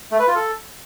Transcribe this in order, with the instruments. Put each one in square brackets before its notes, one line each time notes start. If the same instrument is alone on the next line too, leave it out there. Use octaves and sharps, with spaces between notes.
[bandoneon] A3
B4
F4
A4